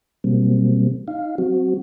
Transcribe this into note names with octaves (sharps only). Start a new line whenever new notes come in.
B2 F#3 G3 A#3 C4
D#4 F5
F#3 C4 F#4